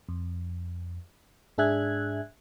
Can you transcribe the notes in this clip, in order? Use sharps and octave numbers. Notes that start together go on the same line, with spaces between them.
F2
G#2 D4 G#4 E5 F#6 G#6